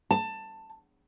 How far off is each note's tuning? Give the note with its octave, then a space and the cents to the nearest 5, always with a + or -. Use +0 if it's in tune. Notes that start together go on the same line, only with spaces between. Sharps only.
A5 +15